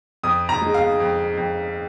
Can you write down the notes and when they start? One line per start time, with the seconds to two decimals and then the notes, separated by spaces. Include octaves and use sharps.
0.23 F2 D#6
0.49 A#5
0.62 G#3
0.74 F5
1.00 F2
1.37 F2